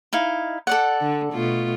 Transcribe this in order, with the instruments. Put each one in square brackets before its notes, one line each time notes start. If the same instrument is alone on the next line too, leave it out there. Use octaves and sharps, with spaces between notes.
[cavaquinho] D#4 E4 F5
A4 D5 F#5
[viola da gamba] D3
B2 A3 F4